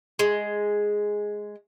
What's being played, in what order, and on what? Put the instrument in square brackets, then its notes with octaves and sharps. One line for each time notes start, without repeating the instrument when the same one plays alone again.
[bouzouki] G#3